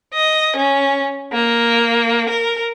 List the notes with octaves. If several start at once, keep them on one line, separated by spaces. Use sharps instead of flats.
D#5
C#4
A#3
A#4